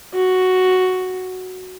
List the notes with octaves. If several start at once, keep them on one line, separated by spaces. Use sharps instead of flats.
F#4